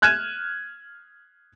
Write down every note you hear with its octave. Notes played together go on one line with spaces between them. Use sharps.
F6 F#6 G#6 D#7 E7